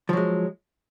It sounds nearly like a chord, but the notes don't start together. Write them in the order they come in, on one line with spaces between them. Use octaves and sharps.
F3 F#3 G#3